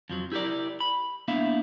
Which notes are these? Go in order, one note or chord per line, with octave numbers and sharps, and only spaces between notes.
F2 F3 F#3
E4 G4 G#4 A#4 D5
B5
A#3 B3 D4 E4 E5 F5